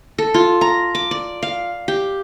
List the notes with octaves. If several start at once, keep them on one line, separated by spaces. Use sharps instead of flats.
A4
F4
A#5
D6
D5
F5
G4